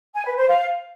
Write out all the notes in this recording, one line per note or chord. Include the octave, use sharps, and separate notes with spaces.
G#5
B4
C5
F5